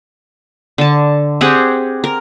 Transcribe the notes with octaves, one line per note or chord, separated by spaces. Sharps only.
D3 A5
C4 G4 G#4 F#5
A#4